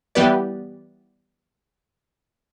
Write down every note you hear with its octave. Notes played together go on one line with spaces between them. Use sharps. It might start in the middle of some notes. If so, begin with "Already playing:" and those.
E3 G3 B3 G4 B4 D5